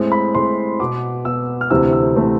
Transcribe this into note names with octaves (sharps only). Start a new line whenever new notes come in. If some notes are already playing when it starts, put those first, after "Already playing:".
Already playing: A2 G#3 C4
B5
A2 G#3 C4 C6
B2 B3 D6
B2 B3 E6
F6
D2 C3 E3 A3 C4 E6
E6
C3 E3 A3 C4